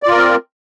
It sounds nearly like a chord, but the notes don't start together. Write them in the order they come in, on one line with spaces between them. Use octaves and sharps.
D5 F4 A#4 C4